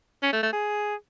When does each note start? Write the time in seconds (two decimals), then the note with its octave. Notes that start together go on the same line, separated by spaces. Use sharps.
0.23 C#4
0.33 A3
0.43 A3
0.53 G#4